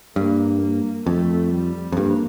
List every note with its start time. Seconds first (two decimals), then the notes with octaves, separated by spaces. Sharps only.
0.16 G2 A#3
0.61 A#3
1.06 F2 A3
1.52 G3
1.92 F2
1.97 G2 A#3